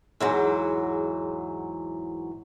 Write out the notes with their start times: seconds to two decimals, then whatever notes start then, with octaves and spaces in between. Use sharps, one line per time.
0.20 E2 G#2 F#3